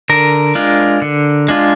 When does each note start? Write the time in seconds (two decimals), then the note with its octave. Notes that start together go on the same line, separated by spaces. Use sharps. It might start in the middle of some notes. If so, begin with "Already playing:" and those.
0.09 D3 A#4
0.55 G#3 D4 F4
1.02 D3
1.48 G#3 D4 F4